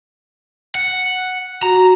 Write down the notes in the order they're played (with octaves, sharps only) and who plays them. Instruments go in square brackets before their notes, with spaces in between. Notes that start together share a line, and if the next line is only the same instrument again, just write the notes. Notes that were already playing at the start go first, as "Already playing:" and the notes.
[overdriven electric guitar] F#5
[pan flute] F#4 [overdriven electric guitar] A#5